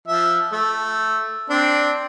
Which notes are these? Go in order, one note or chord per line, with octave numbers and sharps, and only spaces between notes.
F3 E5
A3
C4 D4